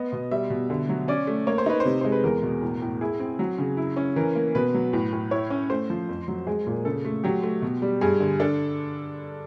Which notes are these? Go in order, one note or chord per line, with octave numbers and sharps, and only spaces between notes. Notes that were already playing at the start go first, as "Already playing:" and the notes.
Already playing: B3 D#5
B2
G3 E5
B2
D3
F#3
C#4 D5
A3
A#3 C#5
C5
D#4 B4
C5
C3
G#3 C5
B4
E2 A#4
B2
A2
A2
E4 G#4
C4
F#3
C#3
E4
C#4
E3 A#4
A#3
B2 B4
F#3
A2
A2
E4 C#5
C#4
A3 C5
F3
F2
F#3
G#3 G#4
A#2
C#3 A4
A3
F#3 G4
A3
B2
G3
G2 G#4
D3
D4 A4